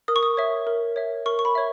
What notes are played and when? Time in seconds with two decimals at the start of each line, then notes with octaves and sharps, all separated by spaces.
0.08 A#4 D#6
0.16 C#6
0.23 D#6
0.37 C#5 E5
0.67 A#4
0.96 C#5 E5
1.26 A#4 C#6
1.39 C#6
1.45 B5
1.55 C#5 E5